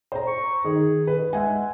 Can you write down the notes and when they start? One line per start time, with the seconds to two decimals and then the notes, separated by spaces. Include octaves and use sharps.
0.12 C5 A#5
0.27 C#6
0.65 D#3 G#4
1.07 B4
1.33 G#3 E5 F#5 G#5